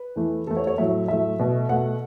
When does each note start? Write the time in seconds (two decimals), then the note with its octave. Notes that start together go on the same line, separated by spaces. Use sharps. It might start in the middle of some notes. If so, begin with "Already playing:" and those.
Already playing: B4
0.16 E2 E3 A3
0.47 E2 E3 A3 A4
0.57 C#5
0.67 C#5
0.78 A2 F#3 A3 E5
1.08 A2 F#3 A3 E5
1.39 B2 A3
1.69 B2 A3 F#5